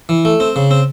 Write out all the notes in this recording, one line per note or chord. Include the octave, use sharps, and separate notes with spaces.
E3
A3
C4
C#3
C4